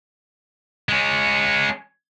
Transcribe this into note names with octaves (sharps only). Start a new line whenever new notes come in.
G#3 C#4